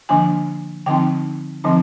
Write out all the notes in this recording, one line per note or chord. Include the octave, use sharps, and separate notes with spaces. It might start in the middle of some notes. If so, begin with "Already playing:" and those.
D3 F3 A#3 D4 G#5
D3 F3 C4 D#4 G5
D3 F3 C4 D#4